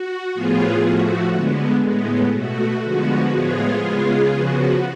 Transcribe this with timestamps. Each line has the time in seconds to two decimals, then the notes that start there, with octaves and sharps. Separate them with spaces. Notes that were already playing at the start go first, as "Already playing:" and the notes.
Already playing: F#4
0.34 A2 F3 B3 F4 G#4
0.84 A2 F3 A3 F#4
1.33 D3 G#3 B3
1.83 A2 G#3 B3
2.33 B2 A3 F#4
2.83 D3 F3 G#3 B3
3.32 A2 F3 G#3 B3 F4 G#4
3.81 C#3 G#3 B3
4.31 C#3 F3 B3 F#4